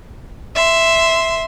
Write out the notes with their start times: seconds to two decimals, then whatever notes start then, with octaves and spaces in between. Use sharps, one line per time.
0.55 E5 C6